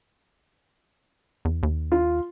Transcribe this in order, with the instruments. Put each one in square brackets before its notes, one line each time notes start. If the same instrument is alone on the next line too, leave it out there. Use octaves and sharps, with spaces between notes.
[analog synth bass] E2
D#2
[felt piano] F4